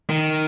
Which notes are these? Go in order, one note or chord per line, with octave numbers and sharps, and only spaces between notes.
D#3